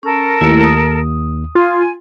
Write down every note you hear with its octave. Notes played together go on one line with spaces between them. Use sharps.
C#4 A4 A#4
D#2 A3 E4
D#6
F4 G#5